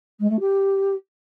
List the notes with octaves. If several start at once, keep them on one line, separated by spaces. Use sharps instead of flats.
G#3
A3
G4